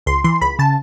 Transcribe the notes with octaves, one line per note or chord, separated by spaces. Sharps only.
C#2 C6
E3 C6
C#2 B5
C#3 A5